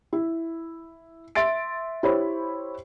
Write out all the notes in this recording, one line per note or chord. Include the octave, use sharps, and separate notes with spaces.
E4
E5 C6 A6 D7
E4 G4 C5 C#5 B5